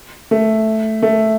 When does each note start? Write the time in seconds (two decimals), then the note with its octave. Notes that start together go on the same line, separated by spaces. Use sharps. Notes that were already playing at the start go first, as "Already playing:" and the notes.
0.31 A3
1.02 A3